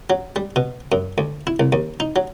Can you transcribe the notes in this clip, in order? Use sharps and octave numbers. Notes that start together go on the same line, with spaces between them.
F#3
G3
B2
F#2
D2
E4
C2
D#2
D#4
F#3